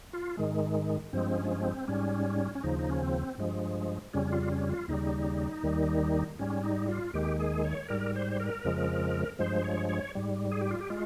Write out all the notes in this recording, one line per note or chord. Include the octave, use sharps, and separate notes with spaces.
F4
G#2 D#3 G#3
G2 F3 G#3 C4
C#4
C#4
C4
G#2 G3 C#4
C#4
D#2 C#3 F3 D#4
D#4
C#4
C4
G2 F3 G#3
F2 C#3 G3 C#4
F4
C#4
F4
D#2 C#3 G3 D#4
D#2 D#3 G3
G#2 G3 C#4
D#4
F4
D#2 D#3 G#3 G4
G#4
C#5
G#2 G3 A#4
C5
A#4
F2 C#3 F3 G#3
G2 F3 G#3 C5
C#5
C#5
G#2 G3
G#4
G4
F4
G4
G#3 F4